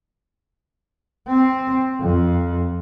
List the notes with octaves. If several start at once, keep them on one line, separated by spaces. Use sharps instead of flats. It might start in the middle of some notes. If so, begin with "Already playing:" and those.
C4
F2